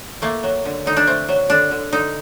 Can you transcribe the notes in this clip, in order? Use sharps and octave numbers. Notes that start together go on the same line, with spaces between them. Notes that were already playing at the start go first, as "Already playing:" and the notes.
A3 A#3
F#3
D3
D3 D#4
D4
A3 C4
F#3
D3 D4
D3
D3 D#4